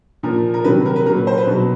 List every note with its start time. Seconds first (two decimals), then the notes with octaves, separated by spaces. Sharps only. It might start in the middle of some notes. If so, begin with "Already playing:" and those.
0.23 A#2 F3 A#4
0.54 A#4
0.64 C3 D#3 F#3 B4
0.86 A#4
0.96 B4
1.06 A#2 F#3 A#4
1.16 B4
1.27 C5
1.37 B4
1.47 B2 F#3